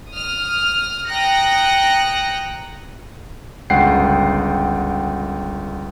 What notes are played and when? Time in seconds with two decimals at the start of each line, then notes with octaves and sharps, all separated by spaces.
0.10 D#6 F6
1.06 G5 A#5 D#6 F#6 A#6 C#7
3.70 G1 C#2 F#5 G5 C7